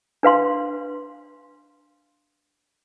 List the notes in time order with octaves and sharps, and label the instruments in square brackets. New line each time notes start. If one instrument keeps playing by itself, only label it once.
[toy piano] D4 B4 F5 C6